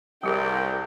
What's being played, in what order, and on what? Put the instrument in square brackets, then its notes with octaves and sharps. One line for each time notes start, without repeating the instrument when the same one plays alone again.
[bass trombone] C2 [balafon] G3 G4 G#4 [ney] A#4 [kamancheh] G5